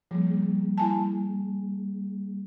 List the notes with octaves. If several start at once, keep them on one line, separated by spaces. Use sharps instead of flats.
F3 G3 A#3 G#4
E4 G#5 A5